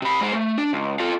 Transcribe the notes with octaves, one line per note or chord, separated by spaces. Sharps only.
C3 B5
G#3 C5
A3
D4
C#2
F4 A4